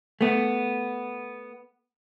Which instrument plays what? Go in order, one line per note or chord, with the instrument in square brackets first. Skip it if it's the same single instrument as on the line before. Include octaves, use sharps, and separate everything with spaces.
[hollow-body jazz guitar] A3 B3